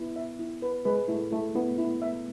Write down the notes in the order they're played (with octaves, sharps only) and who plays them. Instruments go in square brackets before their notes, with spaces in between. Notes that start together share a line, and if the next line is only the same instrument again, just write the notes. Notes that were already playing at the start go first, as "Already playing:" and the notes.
Already playing: [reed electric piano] B3 [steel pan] E4
[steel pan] E5
E4
B4
[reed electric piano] G#3 [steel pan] B4
[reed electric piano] A3 [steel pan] E4
[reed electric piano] A3 [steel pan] E4
[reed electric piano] B3 [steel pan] E4
[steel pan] E4
E5